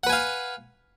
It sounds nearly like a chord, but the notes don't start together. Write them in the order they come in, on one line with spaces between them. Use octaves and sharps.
F#5 B4 G#5 F5